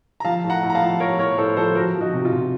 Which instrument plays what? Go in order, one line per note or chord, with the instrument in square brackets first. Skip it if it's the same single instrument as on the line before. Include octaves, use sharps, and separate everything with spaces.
[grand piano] A#5
F3 F5 A5
A2
F#5 A#5
A2
A#5
F5 A5
F3
F3 A#4 C#5
A2 A#4 C#5
A2 A4 C5
F3 A4 C5
F3 F#4 A#4
F3
D#4 F#4
C3
F4
C3